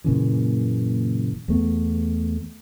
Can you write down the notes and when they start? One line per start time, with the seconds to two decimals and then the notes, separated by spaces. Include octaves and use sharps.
0.04 F#1 A#2 C#3 E3
1.48 E2 A3 B3